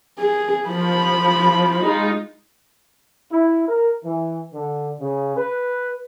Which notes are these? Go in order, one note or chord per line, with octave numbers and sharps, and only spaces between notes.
G#4
F3 B5
G#3 D#4 F4
E4
A#4
E3
D3
C#3
B4